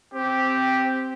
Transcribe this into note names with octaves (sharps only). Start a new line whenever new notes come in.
C4 G4